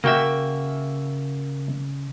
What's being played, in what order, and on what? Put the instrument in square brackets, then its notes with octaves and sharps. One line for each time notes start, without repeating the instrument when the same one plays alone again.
[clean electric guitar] C#3 E5 [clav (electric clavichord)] A#3 F#4 G5